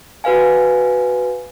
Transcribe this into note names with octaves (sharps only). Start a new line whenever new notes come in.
F#4 B4 F5 G#5